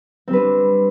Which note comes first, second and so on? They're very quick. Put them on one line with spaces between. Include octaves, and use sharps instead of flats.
C4 G3 B4 D4